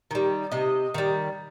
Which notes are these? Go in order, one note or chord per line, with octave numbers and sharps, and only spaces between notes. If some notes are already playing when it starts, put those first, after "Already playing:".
D#3 G3
C3 D#5
D#3 G3